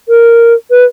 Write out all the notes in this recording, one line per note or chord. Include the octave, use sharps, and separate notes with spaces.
A#4
B4